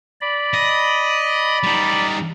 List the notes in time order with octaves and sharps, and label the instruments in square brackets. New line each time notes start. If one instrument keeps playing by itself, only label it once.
[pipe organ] D5 B5
[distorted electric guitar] D#5
G3 D#4